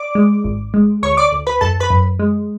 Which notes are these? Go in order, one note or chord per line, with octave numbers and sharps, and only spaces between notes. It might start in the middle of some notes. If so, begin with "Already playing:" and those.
Already playing: D5 D6
G#3
G#1
G#3
D2 C#5 C#6
D5 D6
D2
B4 B5
F#2 A4 A5
B4 B5
F#2
G#3